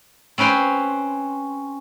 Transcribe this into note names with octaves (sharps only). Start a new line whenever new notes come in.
C4 C#4 B4 G5 C6